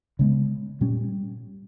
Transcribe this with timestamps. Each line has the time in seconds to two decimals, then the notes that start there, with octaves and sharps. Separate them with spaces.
0.19 C#3 G#3 B3
0.81 A#2 G3 C#4